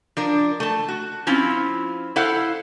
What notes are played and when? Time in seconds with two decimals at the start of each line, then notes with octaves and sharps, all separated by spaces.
0.17 F3 D4 A#4
0.60 A3 A5
0.89 F#4
1.27 F3 C4 C#4 E4 F4
2.16 E4 A4 C5 F5 F#5